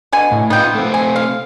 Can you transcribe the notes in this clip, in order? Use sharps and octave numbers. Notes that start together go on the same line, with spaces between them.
B2 D3 G#5
A2
B3 D#4 F4 G5
A3 C4
G#5
F5